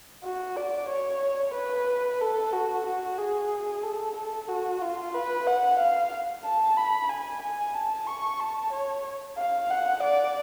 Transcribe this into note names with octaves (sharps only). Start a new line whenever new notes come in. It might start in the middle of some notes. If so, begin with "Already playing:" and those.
F#4
D5
C#5
B4
A4
F#4
F#4
G#4
A4
A4
F#4
F4
B4
F#5
F5
A5
B5
G#5
G#5
A5
C#6
A5
C#5
F5
F#5
D5